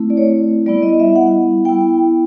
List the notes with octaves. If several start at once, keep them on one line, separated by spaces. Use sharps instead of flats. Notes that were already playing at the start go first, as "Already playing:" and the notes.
Already playing: A3 C4 E4
D5
C#5
G3 B3 E4 D5
D#5
E5
F#5
B3 E4 G5